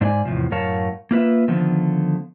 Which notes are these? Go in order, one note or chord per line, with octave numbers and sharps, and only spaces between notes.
G#2 D4 E4 D5 G#5
E2 A2 C3 F3
F#2 A2 A#4 C#5 F5 A5
A#3 F4 B4 E5
D3 D#3 F3 A3 B3